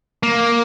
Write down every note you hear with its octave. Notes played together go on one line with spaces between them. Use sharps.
A#3